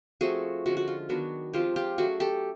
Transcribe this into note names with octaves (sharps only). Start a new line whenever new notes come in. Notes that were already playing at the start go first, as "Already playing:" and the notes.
F3 A3 C4 F#4 G#4
D3 F3 G#3 C#4 F#4
F#4
F4
D#3 F#3 B3 D4 F#4
F3 G#3 C4 F4 G4
F4 G4
F#3 A3 C#4 F#4 G#4
G4 A4